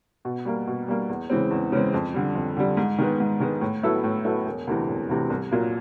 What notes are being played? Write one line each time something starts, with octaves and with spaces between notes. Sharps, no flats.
B2
G3 A#3
B2
G3 A#3
E2
C#3 E3 G#3 C4
E2
C#3 E3 G#3 C4
F2
D3 G3
F2
D3 G3
G#2
D#3 G#3 B3
G#2
D#3 G#3 B3
A2
F#3 B3 E4 A4
A2
F#3 B3 E4 A4
E1
D2 C3 E3
E1
D2 C3 E3
C2
A#2 F#3 A#3